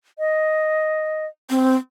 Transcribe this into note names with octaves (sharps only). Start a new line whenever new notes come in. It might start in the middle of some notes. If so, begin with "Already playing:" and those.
D#5
C4